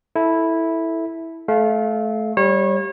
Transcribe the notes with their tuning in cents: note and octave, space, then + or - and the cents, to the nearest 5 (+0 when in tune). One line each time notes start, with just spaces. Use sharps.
E4 -10 A4 +0
A3 -25 F5 +0
G3 +0 C#5 -30